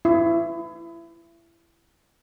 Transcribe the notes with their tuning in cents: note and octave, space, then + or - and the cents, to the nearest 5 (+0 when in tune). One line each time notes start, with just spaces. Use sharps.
E4 +25